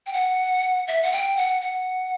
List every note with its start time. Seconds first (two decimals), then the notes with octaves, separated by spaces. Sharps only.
0.06 G5
0.13 F#5
0.88 E5
1.03 F#5
1.12 G5
1.37 F#5
1.62 F#5